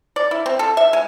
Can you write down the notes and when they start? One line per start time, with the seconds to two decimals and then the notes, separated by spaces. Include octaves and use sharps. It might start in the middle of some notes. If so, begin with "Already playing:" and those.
0.16 D5
0.31 E4
0.46 C4
0.59 A4
0.77 E5
0.93 G#3